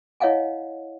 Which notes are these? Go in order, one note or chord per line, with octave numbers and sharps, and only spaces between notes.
E4 C#5 D#5 F5 F#5 G#5